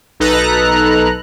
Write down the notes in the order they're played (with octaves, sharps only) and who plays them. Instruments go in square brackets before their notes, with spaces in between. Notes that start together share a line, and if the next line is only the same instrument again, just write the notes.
[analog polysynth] B1 D#4 A4 B4 A#5 F#6